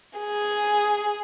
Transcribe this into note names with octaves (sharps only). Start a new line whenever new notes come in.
G#4